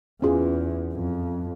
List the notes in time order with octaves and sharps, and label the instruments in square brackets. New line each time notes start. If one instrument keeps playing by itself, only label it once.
[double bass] E2 [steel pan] C#4 F4 G#4
[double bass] F2